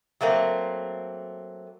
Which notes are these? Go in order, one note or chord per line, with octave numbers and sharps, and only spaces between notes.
F#3 A3 A#3 C4